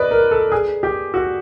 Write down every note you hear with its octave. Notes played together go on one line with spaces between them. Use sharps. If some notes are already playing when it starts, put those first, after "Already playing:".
Already playing: B4 D5 D#5
A#4
A4
G#4
G4
F#4